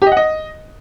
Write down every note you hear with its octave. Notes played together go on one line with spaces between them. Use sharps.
G4
D#5
F#5
D#5